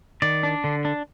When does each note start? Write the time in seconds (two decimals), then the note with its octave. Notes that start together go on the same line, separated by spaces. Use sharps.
0.22 D#3 D5
0.43 D4
0.64 D3
0.85 D4